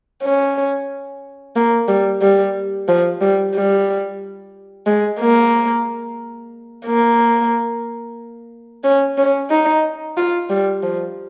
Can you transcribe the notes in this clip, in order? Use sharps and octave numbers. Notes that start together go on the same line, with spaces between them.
C#4
A#3
G3
G3
F3
G3
G3
G#3
A#3
A#3
C#4
C#4
D#4
F4
G3
F3